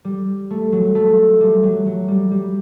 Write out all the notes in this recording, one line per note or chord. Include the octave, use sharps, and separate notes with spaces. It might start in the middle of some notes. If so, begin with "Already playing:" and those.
G3
A3
F#3
A3
G3
F#3
F#3
G3
G3